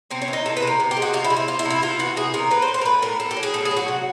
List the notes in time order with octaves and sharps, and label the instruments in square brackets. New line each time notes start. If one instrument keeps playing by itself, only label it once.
[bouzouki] C3 C4
C#4
E3
D#4
C3 A4
B4
C3 A#4
C3
G4
G#3
F#4
C3 F4
E4
C3
E4
C3 F4
E4
C3
E4
C3 F4
E3 F#4
C3 G#4
C3 A#4
A2 B4
C5
A2
C5
A#4
A3 B4
A2 A#4
A2 A4
G4
F#3
G#4
A2 A4
G#4
F#3
F#4
C3